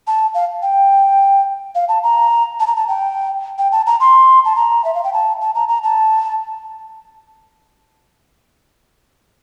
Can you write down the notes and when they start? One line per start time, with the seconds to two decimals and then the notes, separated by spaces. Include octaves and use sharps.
0.07 A5
0.34 F5
0.62 G5
1.75 F5
1.89 A5
2.03 A#5
2.60 A5
2.67 A#5
2.76 A5
2.88 G5
3.58 G5
3.72 A5
3.87 A#5
4.00 C6
4.45 A5
4.56 A#5
4.85 E5
4.95 F5
5.04 G5
5.13 A5
5.41 A5
5.55 A#5
5.69 A#5
5.83 A5